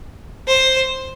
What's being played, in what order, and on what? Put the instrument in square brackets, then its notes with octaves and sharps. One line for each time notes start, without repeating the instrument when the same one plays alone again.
[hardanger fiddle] C5